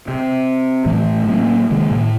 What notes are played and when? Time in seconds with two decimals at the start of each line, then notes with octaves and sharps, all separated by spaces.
0.08 C3
0.86 A2 E3 A3
1.28 A2 F#3 A#3 C#4
1.70 C3 D#3 G#3 A#3
1.91 A2